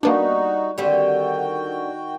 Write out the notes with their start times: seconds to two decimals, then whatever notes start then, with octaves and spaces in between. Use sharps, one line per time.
0.03 G3 A#3 B3 D4 D#4 F#4
0.78 D3 D#3 G3 C4 F#4 G5